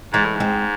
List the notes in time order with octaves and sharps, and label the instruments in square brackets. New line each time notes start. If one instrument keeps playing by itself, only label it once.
[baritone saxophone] G#2 [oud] E3 G#3
[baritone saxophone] A2
[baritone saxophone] G#2 [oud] G#3 C4